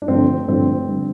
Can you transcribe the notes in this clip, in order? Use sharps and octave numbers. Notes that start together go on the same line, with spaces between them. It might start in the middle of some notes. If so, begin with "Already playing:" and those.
D4
G2 D3 F3 A3 C4
G2 D3 F3 A3 C4
D3 G3